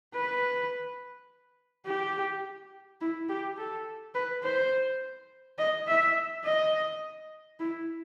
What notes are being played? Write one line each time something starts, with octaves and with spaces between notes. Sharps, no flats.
B4
G4
E4
G4
A4
B4
C5
D#5
E5
D#5
E4